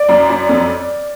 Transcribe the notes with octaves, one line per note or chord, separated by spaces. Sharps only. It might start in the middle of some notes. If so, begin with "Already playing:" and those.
Already playing: D5
F#2
F#2
F2